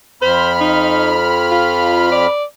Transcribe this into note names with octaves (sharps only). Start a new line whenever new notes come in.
F2 C5 B5 F6
D#4
F4
D5